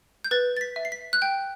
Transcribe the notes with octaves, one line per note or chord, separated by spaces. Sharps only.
G6
B4 A6
A6
B6
E5
C7
B6
F#6
G5 G6